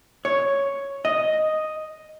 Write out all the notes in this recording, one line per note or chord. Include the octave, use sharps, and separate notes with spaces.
C#5
D#5